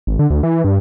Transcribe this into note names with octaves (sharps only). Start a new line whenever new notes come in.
G#1
D3
D2
E3
G2